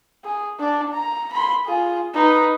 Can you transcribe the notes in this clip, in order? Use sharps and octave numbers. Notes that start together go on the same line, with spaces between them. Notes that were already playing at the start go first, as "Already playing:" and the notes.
G#4
D4 D5
A#5
B5 C6
F4 G#4
D#4 B4